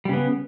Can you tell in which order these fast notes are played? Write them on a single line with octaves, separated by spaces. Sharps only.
G3 C#3 B3